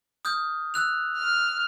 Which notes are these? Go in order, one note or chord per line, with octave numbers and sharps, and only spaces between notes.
D#6 F6 G6
E6 F#6 F7
F6